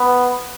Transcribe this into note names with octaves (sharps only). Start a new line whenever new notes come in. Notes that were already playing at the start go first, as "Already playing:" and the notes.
Already playing: B3